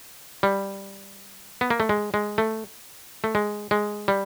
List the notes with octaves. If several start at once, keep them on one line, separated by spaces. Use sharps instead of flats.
G3
B3
A#3
A3
G#3
G#3
A3
A3
G#3
G#3
G3